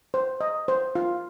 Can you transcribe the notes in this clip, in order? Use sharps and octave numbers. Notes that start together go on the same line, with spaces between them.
C5
D#5
C5
F4